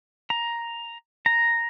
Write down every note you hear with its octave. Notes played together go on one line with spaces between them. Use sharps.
A#5
A#5